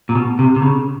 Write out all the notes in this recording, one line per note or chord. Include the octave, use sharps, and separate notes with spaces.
A#2
B2
C3
C3
C#3